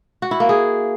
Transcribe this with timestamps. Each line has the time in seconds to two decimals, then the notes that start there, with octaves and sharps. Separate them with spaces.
0.22 F#4
0.31 E4
0.40 A#3
0.49 G#4